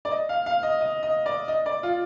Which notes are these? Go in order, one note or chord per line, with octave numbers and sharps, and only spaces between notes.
D5
D#5
F5
F5
D#5
D#5
D#5
D5
D#5
D5
F4